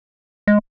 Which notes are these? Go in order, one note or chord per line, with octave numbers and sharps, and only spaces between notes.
G#3